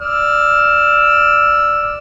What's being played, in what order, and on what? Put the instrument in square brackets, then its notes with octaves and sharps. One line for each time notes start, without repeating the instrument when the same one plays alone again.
[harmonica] D5 E6 F6